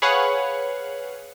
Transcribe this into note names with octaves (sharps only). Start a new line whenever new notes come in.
G#4 B4 C#5 F5 F#5